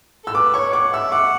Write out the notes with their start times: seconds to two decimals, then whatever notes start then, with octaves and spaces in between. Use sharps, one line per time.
0.24 A4 E6
0.34 B4 D6
0.54 C#5 C#6
0.73 F#5 D6
0.92 E5 E6
1.12 F#5 D6